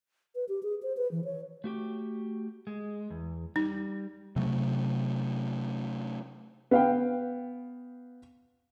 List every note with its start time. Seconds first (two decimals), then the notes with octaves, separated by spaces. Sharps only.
0.35 B4
0.49 G4
0.63 G#4
0.83 C5
0.97 B4
1.11 E3
1.24 C#5
1.64 A3 F#4 G4
2.67 G#3
3.10 E2
3.56 G3 D#4
4.36 C3 F#3 A3
6.71 B3 F5 G5